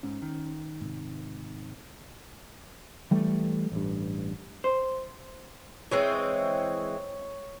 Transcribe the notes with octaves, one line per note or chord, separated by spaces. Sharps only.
G#2 C#4
D#3
G#2 C3
E3 G3 A3
A1 G2
C5
E3 G#3 C4 C#5